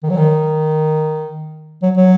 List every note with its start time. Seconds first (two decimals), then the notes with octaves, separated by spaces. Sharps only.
0.03 D#3
0.10 F#3
0.17 D#3
1.82 F#3
1.97 F#3